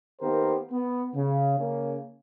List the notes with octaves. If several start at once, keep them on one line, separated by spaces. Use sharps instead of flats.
D#3 A#3 B3 G4 A#4 C5
B3
C#3
C#3 A#3 C#4